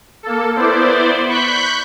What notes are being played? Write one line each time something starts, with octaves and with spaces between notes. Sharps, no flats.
A#3 A4
B3 E4 C5 D5
B5 C#6 F#6 G6 B6